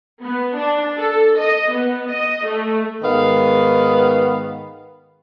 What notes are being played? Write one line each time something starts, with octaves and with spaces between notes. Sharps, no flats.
B3
D4
A4
D#5
B3
D#5
A3
G#2 D#3 B3 F5